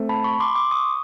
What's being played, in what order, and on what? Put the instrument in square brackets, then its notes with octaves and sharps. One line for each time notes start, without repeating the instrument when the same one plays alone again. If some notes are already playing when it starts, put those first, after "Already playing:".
Already playing: [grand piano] A3 C4
[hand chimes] A5 B5
B5 C#6
C6 D6
C6 D6
C#6 D#6